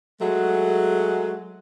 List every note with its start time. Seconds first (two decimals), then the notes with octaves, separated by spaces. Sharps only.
0.21 F#3 G#3 A3 F#4 G#4